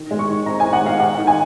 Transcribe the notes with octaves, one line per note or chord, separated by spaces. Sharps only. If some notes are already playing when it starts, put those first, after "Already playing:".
Already playing: D#3
G#3
C#6
D#3
C4 A#5
G#5
D#3
F#5
G#3 F5
D#4 F#5
D#3
G#5